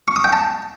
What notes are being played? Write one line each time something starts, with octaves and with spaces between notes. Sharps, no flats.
C#6
D#6
G5
A5